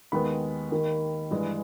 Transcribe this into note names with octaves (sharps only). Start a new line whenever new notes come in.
D#2 D#3 G#3 B3 B5
D#2 D#3 A#3
G2 E3 G#3